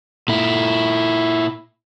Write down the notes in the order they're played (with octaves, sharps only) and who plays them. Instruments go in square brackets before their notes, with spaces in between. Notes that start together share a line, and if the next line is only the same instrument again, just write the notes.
[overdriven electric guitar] A#2 E4